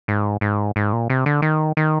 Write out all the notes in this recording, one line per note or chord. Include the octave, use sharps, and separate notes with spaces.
G#2
G#2
G#2
A#2
C3
D3
D#3
D#3